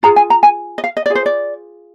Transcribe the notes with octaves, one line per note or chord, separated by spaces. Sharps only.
F4 G#4 A#5
G#5
A#5
G#5
D#5
F5
D#5
F4 G#4 D5
C5
D5